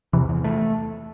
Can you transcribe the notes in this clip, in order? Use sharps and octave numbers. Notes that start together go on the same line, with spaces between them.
E2 C3 E3
E2
A3